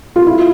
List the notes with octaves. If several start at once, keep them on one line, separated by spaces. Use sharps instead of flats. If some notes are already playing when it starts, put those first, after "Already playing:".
F4
E4